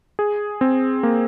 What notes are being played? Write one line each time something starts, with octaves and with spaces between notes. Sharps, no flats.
G#4
C4
A#3